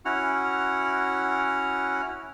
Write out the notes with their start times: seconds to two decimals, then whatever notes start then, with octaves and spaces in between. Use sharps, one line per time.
0.05 C#4 E4 F#4 F#5 F6